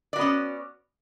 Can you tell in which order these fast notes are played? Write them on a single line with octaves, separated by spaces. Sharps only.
D5 F#4 B3 C#4